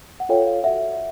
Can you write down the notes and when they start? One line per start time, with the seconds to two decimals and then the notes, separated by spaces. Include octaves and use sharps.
0.20 F#5
0.29 F4 A4 C#5 F5 G5
0.47 F5
0.64 F#4 A4 D5 E5 F#5